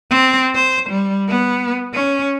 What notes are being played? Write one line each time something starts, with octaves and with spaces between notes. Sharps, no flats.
C4
C5
G3
B3
C#4